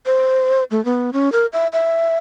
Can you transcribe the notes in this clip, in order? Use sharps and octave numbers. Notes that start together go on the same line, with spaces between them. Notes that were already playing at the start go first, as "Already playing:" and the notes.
C5
A3
B3
C#4
A#4
E5
E5